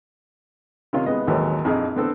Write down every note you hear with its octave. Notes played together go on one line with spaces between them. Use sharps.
C3 D#3 C#4 F4
C2 G#3 B3 D#5
A1 D#2 D#3 F#3 G#3 B4
A#1 F2 D#4 G#4
D3 B3 C4 A4